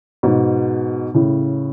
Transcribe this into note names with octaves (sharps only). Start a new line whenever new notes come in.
G#2 B2
A2 C#3